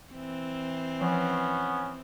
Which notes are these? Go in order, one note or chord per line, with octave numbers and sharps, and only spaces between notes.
E3 C4
F3 B3 C#4